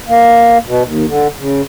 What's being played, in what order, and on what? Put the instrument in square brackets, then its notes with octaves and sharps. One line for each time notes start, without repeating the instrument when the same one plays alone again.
[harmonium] A#3
B2
D#2
D3
C#3